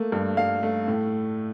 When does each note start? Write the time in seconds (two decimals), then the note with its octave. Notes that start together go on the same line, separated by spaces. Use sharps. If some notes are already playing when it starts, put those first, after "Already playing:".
Already playing: A3 A#3
0.12 G2
0.37 G2 F5
0.63 A3
0.88 A2